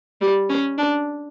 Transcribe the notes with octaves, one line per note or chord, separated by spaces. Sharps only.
G3
C#4
D4